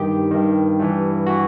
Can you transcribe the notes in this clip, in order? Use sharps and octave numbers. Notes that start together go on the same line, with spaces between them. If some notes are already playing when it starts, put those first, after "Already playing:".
Already playing: G2 D#3 G4
G2 D#3
G2 E3
E3 F#4